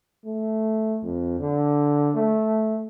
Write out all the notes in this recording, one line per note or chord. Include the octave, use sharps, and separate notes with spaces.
A3
F2
D3
A3